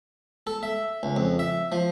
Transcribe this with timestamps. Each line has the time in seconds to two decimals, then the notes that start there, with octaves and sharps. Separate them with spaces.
0.47 A4
0.63 E5
1.03 C#2
1.16 F2
1.39 E5
1.72 F3